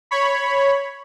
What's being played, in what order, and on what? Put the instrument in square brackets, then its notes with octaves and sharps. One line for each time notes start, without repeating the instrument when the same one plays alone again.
[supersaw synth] C#5 B5